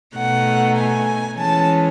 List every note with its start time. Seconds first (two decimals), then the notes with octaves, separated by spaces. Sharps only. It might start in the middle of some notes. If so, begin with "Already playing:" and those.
0.16 B2 A3 D#4 F#5
0.77 G#5
1.38 E3 G#3 C#4 A5